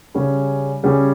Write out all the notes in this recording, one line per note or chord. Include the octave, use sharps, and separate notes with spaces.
C#3 G3 C#4 G#4
C#3 G3 C#4 G#4